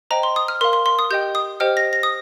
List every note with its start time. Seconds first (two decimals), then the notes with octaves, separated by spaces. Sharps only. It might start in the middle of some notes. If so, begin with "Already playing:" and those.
0.11 C5 D#5 G5 A#5
0.23 C6
0.36 D#6
0.48 F6
0.61 A#4 F5 C6
0.73 C6
0.86 C6
0.99 D#6
1.10 G4 D#5 G5 G6
1.35 D#6
1.60 G4 C5 D#5 G5 F6
1.77 A#6
1.93 A#6
2.03 D#6